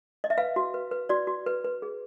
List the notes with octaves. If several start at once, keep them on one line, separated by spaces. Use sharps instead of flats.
D#5
E5
B4 F5
F#4
B4
B4
F#4 D5
F#4
B4
B4
G#4